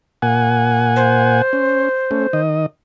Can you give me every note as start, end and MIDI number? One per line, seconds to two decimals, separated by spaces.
0.22 1.42 46
0.22 1.42 78
0.22 1.42 80
0.96 2.40 72
1.53 1.89 61
2.11 2.27 57
2.11 2.27 61
2.33 2.66 51
2.33 2.66 75